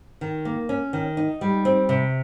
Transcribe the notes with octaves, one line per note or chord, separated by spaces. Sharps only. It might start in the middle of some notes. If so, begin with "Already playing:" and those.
D#3
A#3
C#4
D#3
D#4
G3
C4
C3